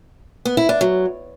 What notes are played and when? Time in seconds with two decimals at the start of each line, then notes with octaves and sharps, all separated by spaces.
0.45 B3
0.57 E4
0.69 D4
0.81 F#3